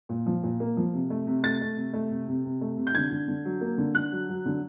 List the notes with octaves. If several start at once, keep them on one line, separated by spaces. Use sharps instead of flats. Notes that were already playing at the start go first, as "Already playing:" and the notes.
A#2
F3
A#2
A#3
F3
C3
A3
C3
A3 A6
A3
C3
A3
C3
C3
C3
A3
C3
G6
D3 G#6
D3
D3
F#3
A#3
D3
D3 F#6
F#3
F#3
D3